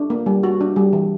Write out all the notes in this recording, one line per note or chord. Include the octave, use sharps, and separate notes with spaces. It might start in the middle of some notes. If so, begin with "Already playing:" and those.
Already playing: D4
A#3
G3
F#4
D4
G3
E3